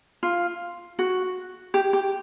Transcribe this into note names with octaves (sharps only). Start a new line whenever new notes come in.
F4
F#4
G4
G4